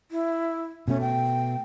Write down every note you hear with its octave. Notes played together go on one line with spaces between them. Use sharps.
E4
B2 A3 C#4
G5